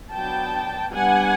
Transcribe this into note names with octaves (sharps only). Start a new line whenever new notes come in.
F#3 B3 D4 G5 A5
G3 B3 D4 F#5 G#5